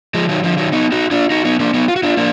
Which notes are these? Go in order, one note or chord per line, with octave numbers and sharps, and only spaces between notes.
F3 G#3
D#3 F#3
D3 F3
D#3 F#3
B3 D#4
D#4 F#4
D4 F4
D#4 F#4
B3 D#4
A#3 D4
B3 D#4
F4
F#4
D4 F4
A#3 D4